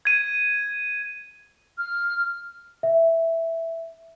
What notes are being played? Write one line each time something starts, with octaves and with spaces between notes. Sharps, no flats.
G#6 D#7
F6
E5